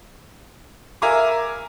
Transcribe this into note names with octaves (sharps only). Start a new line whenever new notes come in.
A#4 E5 F5 G#5 A#5 D6